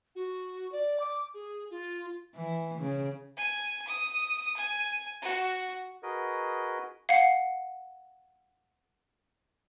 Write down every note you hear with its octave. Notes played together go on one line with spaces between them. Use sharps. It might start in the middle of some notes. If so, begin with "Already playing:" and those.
F#4
D5
D6
G#4
F4
E3
C#3
G#5
D#6
G#5
F#4
F#4 G#4 A#4 B4 D#5
F5 F#5